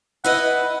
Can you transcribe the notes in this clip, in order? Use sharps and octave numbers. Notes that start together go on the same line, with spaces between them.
E4 B4 D#5 F#5